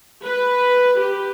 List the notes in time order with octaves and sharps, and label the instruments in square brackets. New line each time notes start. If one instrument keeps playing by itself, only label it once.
[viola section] B4
G4